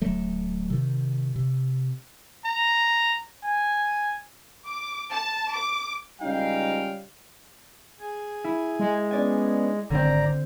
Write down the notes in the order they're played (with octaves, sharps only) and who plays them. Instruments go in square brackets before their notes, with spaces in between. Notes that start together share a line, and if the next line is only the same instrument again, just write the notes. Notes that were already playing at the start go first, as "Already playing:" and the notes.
[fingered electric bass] D1 F#3 A3
C3 D#3
C3
[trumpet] A#5
G#5
[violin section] D6
A5
D6
[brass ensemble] C#2 G3 C#4 D#4 F5 G5
[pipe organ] G#4 G#5
[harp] E4
[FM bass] G#3
[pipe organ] B3 C#4 D4 [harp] D5 G#5
[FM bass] G#1 [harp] D3 C4 [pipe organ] D5 A#5